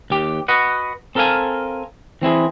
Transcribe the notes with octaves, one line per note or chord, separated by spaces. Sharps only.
D#2 G4
F#4 B4 D#5 F#5
C4 A4 A#4 E5 F5 G#5
E3 C4 E4 G#4